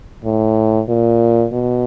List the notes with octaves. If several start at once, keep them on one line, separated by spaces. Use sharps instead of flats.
A2
A#2
B2